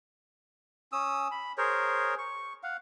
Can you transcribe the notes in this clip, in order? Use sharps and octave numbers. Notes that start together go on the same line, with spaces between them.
C#4 D#6 E6
B5
G#4 A#4 C5 C#5
C#6
F5 F#5